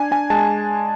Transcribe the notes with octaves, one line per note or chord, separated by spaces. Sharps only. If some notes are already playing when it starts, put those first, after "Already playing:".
Already playing: D4 G#5
D4 G#5
G#3 A5